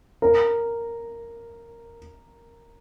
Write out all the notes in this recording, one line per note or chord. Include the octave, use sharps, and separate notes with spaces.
A#4